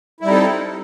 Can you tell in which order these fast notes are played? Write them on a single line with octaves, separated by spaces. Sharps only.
E4 G3 D#4 C4 A4